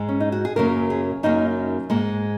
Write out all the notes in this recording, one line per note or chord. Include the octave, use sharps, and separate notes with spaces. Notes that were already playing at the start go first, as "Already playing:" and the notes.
Already playing: G#2 G#3
C#4
D#4
F#4
G#4
F#2 C#3 F#3 A#3 A#4
G#4
F#2 C#3 F#3 A#3 D#4
G#2 G#3 A#3